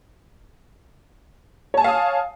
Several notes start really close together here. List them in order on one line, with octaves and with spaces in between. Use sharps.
C#5 A5 G#5 F5 D#6